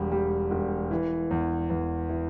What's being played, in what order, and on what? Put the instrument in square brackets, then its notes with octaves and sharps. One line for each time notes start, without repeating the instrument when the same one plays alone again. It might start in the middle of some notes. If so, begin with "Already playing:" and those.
Already playing: [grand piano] E1 G3
G3
E1
E3
E2
E2
E3